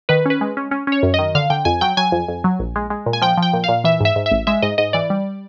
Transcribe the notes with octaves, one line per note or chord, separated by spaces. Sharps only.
D#3 B4
C#4 B4
G#3
C#4
C#4
C#4 C#5
F#2
D#3 D#5
D3 F5
D3 G5
F2 G#5
F#3 G5
F#3 G#5
F2
F2
F#3
A#1
G#3
G#3
A#2
G#5
F3 G5
F3
G5
A#2
A#2 F5
E3 E5
G#2 E5
G#2
E5
A1
G#3 E5
G#2 D#5
G#2 D#5
E3 D5
G3